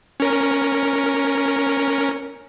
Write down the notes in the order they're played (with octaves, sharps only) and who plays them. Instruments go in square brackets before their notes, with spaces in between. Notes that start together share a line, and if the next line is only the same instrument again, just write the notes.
[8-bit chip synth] C#4 A#4